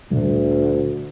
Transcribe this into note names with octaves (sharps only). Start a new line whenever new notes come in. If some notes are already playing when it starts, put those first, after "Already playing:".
D2 A#2 D3 G3